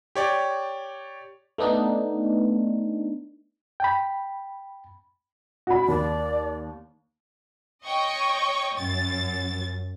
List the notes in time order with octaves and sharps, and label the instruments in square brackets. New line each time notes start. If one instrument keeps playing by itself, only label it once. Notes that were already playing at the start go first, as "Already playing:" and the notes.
[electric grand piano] G4 C#5 D5
[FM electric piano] A3 B3 D4 D#4
[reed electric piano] G5 B5
[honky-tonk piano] F#4 B5
[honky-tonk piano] D#2 [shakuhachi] D5
[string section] C#5 D#5 G5 C#6
F#2 A6